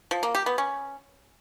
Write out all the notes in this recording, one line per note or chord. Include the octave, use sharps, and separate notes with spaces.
F3
A#3
G4
B3
C#4